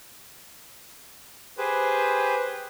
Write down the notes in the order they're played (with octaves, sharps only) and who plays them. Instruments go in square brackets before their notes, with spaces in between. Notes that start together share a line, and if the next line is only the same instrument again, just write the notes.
[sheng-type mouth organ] G4 G#4 B4 C5